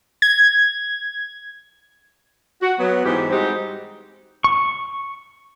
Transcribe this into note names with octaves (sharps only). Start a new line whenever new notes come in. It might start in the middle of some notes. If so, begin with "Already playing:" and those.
G#6
F#4
F#3 B3
G#2 E3 G#3 B3 G4 C5
G3 G#3 C4 D#4 F#4 G4
C#6